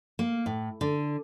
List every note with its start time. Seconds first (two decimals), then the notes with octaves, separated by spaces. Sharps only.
0.19 A#3
0.46 A2
0.81 D3